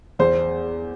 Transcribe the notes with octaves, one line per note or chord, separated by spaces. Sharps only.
E2 C5